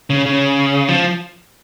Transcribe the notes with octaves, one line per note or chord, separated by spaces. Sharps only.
C#3
C#3
F3